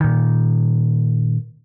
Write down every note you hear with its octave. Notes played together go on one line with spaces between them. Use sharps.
A#2 D#3